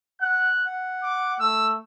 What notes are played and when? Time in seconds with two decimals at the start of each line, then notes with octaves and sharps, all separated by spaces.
0.21 F#5 F#6
0.66 F#5
1.03 D6
1.40 A3 E6